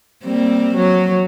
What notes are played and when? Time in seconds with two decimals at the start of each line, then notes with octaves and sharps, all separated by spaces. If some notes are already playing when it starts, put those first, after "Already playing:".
0.24 G3 A#3 C4
0.74 F#3